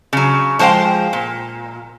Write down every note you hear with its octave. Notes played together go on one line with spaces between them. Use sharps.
C#3 F#3
F3 G#3 C5 F5 G5
A#2